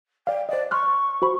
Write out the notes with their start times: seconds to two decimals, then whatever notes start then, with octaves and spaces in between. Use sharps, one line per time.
0.27 D5 F5 G5
0.49 C5 D5 D#5
0.71 C6 C#6 F6 F#6
1.22 F#4 C5 B5